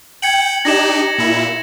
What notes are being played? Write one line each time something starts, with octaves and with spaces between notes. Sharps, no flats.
G5 G#6 C#7 F#7
D4 D#4 G4 A#6 E7
A#2 E4